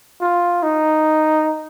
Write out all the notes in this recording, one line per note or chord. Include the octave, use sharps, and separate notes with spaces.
F4
D#4